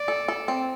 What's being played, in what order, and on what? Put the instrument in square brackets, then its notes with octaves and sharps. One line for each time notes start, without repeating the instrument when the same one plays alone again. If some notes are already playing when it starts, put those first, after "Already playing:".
Already playing: [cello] D5
[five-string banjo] A4
A4
C4